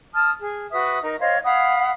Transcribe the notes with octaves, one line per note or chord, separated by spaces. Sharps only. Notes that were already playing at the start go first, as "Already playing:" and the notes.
A5 D#6 F6
G#4
F#4 B4 E5 D#6
D#4 A#4
C5 C#5 D#5 F5
F5 F#5 B5 D#6